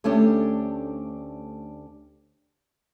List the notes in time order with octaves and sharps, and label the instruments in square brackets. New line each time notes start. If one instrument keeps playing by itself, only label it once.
[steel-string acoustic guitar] D2 A3 C#4 D4 G4